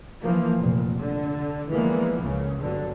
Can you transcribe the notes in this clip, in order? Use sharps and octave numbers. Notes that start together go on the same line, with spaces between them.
E3 F3 A#3
F1 A#2
D3
D3 E3 F3 G#3 A#3 B3
C#2 C#3
G1 D3 F#3